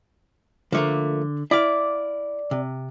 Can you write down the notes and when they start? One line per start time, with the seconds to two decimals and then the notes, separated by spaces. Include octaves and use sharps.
0.72 D3 F3 A3 A#3
1.51 E4 D5 F5
2.51 C3